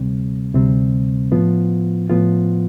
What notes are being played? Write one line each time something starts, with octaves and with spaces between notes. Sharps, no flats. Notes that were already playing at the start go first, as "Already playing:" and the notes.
Already playing: D2 C3 G3 C4
D2 C3 G3 C4
A2 F3 B3 F4
A2 F3 B3 F4